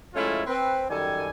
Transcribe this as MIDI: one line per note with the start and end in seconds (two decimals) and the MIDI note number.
0.15 0.43 53
0.15 0.43 56
0.15 0.43 57
0.15 0.43 61
0.15 0.43 64
0.15 0.43 65
0.47 0.84 60
0.47 0.84 71
0.90 1.30 42
0.90 1.30 51
0.90 1.30 55
0.90 1.30 69
0.90 1.30 80